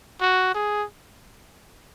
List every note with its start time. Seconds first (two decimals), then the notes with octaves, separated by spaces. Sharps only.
0.22 F#4
0.55 G#4